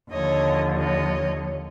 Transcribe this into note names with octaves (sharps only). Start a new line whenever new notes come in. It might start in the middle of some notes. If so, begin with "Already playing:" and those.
D#2 D3 F3 C#5 D#5
C#5 D#5